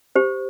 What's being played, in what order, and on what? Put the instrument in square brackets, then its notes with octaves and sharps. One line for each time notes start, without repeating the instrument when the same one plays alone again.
[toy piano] G4 C5